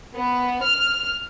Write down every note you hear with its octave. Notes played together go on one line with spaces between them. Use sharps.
B3
F6